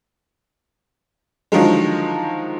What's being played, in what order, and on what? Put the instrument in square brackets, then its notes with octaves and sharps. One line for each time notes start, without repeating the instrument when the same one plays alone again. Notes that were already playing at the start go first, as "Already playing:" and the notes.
[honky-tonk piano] D3 D#3 F3 F#3 G#3